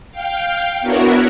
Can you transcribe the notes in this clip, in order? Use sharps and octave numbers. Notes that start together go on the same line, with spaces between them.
F5 G5
B3 D4 E4 F#4 A#4 C#5